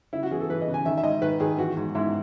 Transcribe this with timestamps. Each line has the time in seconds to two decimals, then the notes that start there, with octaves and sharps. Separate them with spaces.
0.13 C#3 E4
0.23 F#4
0.31 E3 G#4
0.40 A4
0.50 E3 B4
0.61 D#5
0.67 C#3
0.74 G#5
0.86 D#3 E5
0.98 E5
1.03 G#2 D#5
1.21 D#3 B4
1.40 D#3 G#4
1.58 E3 F#4
1.77 G#2
1.95 G#2 E4